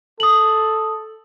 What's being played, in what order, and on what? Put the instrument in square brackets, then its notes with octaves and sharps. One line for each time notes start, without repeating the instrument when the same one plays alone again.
[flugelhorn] A4 [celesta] D#6 F#7